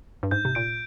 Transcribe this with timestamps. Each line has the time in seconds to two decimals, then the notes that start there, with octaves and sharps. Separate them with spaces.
0.23 G2
0.31 G#2 G6
0.45 C3
0.55 A#2 D7